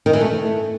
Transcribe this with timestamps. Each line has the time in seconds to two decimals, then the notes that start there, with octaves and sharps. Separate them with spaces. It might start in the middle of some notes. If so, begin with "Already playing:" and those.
0.06 D#3
0.13 E3
0.21 A3